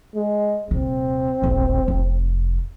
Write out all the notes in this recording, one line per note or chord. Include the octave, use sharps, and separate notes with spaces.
G#3
D#1 C3 C4
D#1 A1
F1